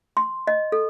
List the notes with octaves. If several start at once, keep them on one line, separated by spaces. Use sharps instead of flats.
C6
D#5
A4